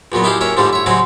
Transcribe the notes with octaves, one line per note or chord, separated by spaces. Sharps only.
E2 A#2 F#3 B3
D#4 E4 G4 G#4 F5
A#3 C#4 C#5 E5
F2 G#2 D3 G3 A3
C#5 E5
C#3 F#3 G#3 C4 F#4